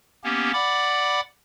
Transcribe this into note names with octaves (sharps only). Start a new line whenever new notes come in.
A#3 B3 C#4 G4
D5 F#5 B5 D6